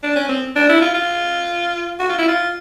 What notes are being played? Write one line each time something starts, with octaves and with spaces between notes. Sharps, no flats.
D4
C#4
C4
D4
E4
F4
F4
F#4
F4
E4
F4